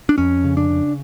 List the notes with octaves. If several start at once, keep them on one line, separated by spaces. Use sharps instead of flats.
D4
F2 C#4
C#3
D4
C#3